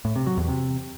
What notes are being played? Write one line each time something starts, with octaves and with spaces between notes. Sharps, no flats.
A2
C3
F#3
E2
C3